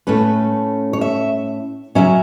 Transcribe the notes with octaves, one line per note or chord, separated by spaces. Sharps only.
A2 A3 C#4 B4
C#5
E5
C#3 F#3 C#4 E5